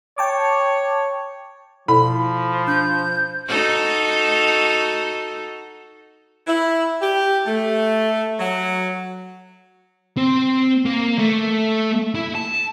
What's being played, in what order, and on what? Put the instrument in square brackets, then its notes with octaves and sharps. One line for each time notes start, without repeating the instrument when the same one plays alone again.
[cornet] C#5 [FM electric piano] G5 A5 D6
[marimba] B2 E4 A4 [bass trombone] F3 [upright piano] B5
[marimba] D4 [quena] G6
[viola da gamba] D#4 F#4 A4
[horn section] E4
G4
A3
F#3
[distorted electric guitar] C4
A#3
A3
E4
A5